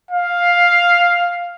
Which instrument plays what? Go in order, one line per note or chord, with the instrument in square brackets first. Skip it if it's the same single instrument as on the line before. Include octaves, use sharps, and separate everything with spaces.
[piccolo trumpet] F5